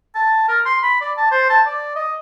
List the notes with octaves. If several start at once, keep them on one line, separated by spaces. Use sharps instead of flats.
A5
A#4
C6
B5
D5
A5
C5
A5
D5
D#5